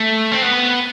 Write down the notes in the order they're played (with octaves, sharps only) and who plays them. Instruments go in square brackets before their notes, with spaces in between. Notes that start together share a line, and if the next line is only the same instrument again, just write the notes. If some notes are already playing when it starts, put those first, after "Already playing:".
Already playing: [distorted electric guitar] A3
C4
B3